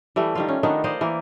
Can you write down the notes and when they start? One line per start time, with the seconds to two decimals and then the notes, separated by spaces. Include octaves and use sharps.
0.16 E3 G3 A3
0.35 D#3 G3 F4
0.48 C#4
0.63 D#3 B3 D4 D#4
0.84 C5 D5 D#5 F5
1.01 E3 A#3